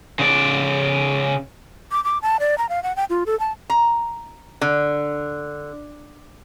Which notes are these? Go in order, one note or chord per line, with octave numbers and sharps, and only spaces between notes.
C#3 D5
D6
D6
A5
D5
A#5
F5
F#5
G5
F4
A4
A5
A#5
D3